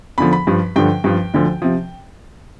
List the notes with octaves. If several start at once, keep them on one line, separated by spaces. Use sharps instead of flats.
E2 D3 F3 B5
B5
G2 F3
G2 D3 F3 G5
G2 F3
D2 D3 F3
C3 F3